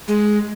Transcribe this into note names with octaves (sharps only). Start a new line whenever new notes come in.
G#3